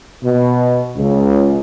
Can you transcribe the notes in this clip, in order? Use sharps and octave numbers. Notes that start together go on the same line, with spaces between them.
B2
C#2